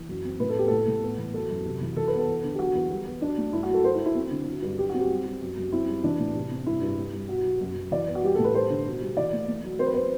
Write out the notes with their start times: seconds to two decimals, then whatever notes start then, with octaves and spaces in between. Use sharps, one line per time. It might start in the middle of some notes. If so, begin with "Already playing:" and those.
Already playing: E3
0.08 F#2
0.25 C4
0.40 A2 B4
0.50 A4
0.56 B3 G4
0.68 A2 A4
0.87 A2
1.03 B3
1.18 E3
1.34 F#3 A4
1.49 F#2
1.65 C3
1.81 E3
1.96 E3 A4
2.07 B3 B4
2.18 A4
2.27 E2
2.44 D3
2.54 G4
2.59 F#3 F#4
2.75 E2
2.90 G3
3.06 B3
3.21 F#3 D4
3.38 A3
3.53 G2 E4
3.63 F#4
3.69 F#3
3.74 A4
3.84 F#3 C5
3.95 E4
4.00 F#3
4.06 E4
4.15 C4
4.31 D3
4.47 F#3
4.62 G2
4.78 F#3 G4
4.89 F#4
4.94 C4
5.00 G4
5.10 G3
5.25 G3
5.41 F#2
5.57 F#2
5.72 C4 E4
5.88 G3
6.04 E3 D4
6.20 A2
6.35 C3
6.51 C4
6.66 G2 E4
6.82 G2
6.98 G3
7.13 G3
7.29 B2 F#4
7.44 F#3
7.61 F#2
7.75 F#2
7.91 E3 D5
8.07 B3
8.15 F#4
8.23 G3 G4
8.35 A2 A4
8.44 B4
8.54 G3 C5
8.70 D3
8.85 B2
9.01 G3
9.17 E3 D5
9.33 A3
9.48 A3
9.64 F#3
9.79 C4 C5
9.86 B4
9.94 C4 C5